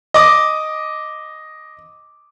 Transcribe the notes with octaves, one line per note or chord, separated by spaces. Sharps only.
D#5 D6 D#6